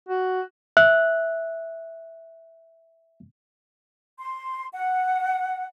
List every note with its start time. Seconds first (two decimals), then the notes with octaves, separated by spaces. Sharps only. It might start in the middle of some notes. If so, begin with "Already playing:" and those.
0.09 F#4
0.77 E5 F#6
4.19 C6
4.74 F#5